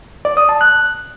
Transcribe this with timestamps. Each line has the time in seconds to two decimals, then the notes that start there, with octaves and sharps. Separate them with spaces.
0.25 D5
0.37 D#6
0.49 A5
0.61 F#6